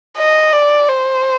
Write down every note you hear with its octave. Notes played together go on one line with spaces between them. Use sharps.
D#5
D5
C5